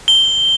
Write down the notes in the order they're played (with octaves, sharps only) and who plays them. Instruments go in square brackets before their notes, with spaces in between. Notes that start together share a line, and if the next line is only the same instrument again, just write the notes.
[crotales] G7